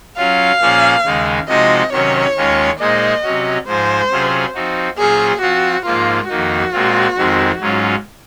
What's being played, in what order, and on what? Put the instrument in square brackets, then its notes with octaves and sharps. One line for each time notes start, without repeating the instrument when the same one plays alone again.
[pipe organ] F#3 C#4 F4 [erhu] F5
[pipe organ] A#2 F3 A#3 C#4 G#4
D#2 C#3 G#3 D#4
[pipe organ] C3 F3 G#3 D#4 F#4 [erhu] D#5
[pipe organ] C3 D#3 F#3 C#4 [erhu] C#5
[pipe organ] D#2 D#3 G#3 C#4 F4
[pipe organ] A#2 G#3 D#4 G#4 C5 [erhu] D#5
[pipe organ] C3 F#3 C#4 F#4
[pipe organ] G#2 F3 G#3 [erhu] C5
[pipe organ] C3 F#3 C#4 F4 G#4
F3 C4 D#4 F#4
[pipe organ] A#2 F#3 C#4 F4 C5 [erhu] G#4
[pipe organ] F3 C4 F4 [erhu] F#4
[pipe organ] G#2 F3 A#3 [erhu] F4
[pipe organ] F2 D#3 A#3 D#4 [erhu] F#4
[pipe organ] A#2 G#3 C4 F4
F2 D#3 G#3 C4
G#2 F#3 C#4 F4